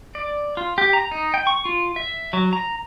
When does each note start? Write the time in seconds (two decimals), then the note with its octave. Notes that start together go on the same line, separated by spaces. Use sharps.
0.15 D5
0.57 F4
0.78 G4
0.93 A#5
1.11 D#4
1.34 G5
1.47 C#6
1.65 F4
1.96 E5
2.33 F#3
2.53 A#5